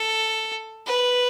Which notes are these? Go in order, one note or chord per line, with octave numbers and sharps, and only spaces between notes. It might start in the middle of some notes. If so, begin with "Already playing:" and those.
Already playing: A4
B4